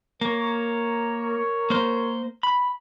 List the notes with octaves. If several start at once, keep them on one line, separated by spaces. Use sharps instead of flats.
A#3 A#4 C#5
A#3 C5
B5